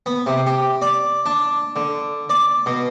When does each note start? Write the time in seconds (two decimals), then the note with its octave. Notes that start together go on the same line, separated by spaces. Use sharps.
0.06 B3
0.26 C3
0.47 G4
0.82 D5
1.26 D4
1.76 D3
2.30 D5
2.66 B2